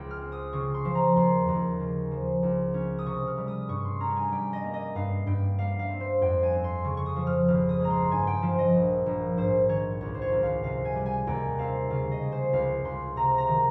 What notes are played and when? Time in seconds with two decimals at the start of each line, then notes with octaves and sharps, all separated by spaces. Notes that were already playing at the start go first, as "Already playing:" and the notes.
Already playing: C#2 G5
0.11 F6
0.21 C4
0.32 D#6
0.53 C#3 C#6
0.74 C6
0.85 F3
0.95 A#5
1.16 D#2 C6
1.48 D#2
1.80 C#3
2.11 F3
2.43 C#2
2.74 C#4
2.99 D#6
3.06 C3 C#6
3.27 F6
3.38 G3
3.48 D#6
3.69 G2 C#6
3.85 C6
4.00 C#4 A#5
4.16 G#5
4.32 G3 G5
4.53 D#5
4.64 A#3
4.74 D#5
4.95 G2 F5
5.26 G2 G5
5.58 G3 F5
5.79 F5
5.90 C4
6.00 C5
6.21 F2 G5
6.43 G#5
6.53 C4
6.64 C6
6.84 C#3 C#6
6.97 C#6
7.06 D#6
7.16 F3
7.27 F6
7.48 G#1 F6
7.69 D#6
7.80 G#3 A#5
7.90 C6
8.11 G2 G#5
8.27 G5
8.42 F3
8.59 D#5
8.74 A#1
9.06 A#1
9.37 G#2 C5
9.69 D#3 C#5
10.01 C#2 C#5
10.14 C5
10.22 C#5
10.32 C#2
10.43 F5
10.63 C3 F5
10.85 G#5
10.95 G3
11.06 G#5
11.27 D#2 G5
11.58 C4 F5
11.90 C#3 F5
12.11 D#5
12.21 G#3
12.32 C5
12.53 C#2 F5
12.85 C#2 C6
13.16 C3 A#5
13.38 A#5
13.48 D#3